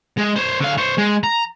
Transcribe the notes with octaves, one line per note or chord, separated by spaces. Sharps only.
G#3
C5 C#5
D3 F5
C5 C#5
G#3
A#5